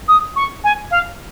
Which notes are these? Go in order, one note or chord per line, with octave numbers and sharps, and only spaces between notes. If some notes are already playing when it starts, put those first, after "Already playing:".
D#6
C#6
G#5
F5